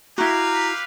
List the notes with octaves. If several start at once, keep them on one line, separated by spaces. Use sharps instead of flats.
E4 F#4 G4 B4 F5 A#5